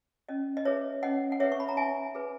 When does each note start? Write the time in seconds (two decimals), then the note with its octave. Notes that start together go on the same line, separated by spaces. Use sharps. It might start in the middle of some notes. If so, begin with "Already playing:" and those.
0.29 C#4 D#5
0.57 D#5
0.65 G#4 B4 C#5 E5
1.03 C#4 D#5 F#5
1.32 F#5
1.40 G#4 B4 C#5 E5
1.52 C#6
1.60 B5
1.69 A#5
1.77 D#4 E5 G#5
2.15 G#4 B4